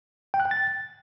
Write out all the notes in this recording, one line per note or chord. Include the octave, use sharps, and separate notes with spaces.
G5
F#6
G5
A6